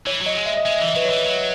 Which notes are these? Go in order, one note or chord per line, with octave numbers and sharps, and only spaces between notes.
E3 C#5
F#3 D#5
G#3
E5
D#5
G#3 E5
E3 D#5
F#3 B4
E3 C#5
F#3